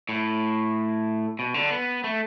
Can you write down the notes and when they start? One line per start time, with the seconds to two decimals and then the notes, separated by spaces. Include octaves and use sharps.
0.09 A2
1.39 B2
1.54 D3
1.71 B3
2.04 A3